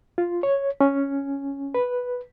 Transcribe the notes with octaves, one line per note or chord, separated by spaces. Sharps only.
F4
C#5
C#4
B4